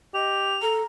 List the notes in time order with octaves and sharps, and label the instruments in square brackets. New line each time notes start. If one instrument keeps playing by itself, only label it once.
[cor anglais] G4 [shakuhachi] D#5 [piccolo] F7
[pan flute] A4 [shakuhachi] A#5